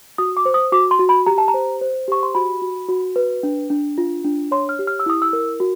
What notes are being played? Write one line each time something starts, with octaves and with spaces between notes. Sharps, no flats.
F#4 D#6
D6
C5
D#6
F#4 D6
C6
F#4
B5
G4 A#5
A5
A#5
C5
C5
G4 C#6
C6
F#4 B5
F#4
F#4
B4
D4
D4
F4
D4
C#5 C6
F6
G4
F6
E6
E4 D#6
E6
A#4
F#4